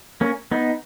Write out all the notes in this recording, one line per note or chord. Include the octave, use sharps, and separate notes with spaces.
A#3 C#4
B3 D#4